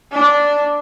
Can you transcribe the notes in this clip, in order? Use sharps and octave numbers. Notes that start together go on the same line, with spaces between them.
D4